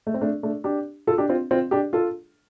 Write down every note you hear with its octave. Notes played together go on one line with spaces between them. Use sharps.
A3
C4
A3 D4
A3 D4
D4 G4
F4 A4
D4 G4
C4 F4
C4 F4
D4 G4
F4 A4